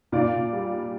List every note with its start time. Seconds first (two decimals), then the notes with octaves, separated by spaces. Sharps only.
0.12 A#2 D5 F5
0.33 A#2
0.53 G3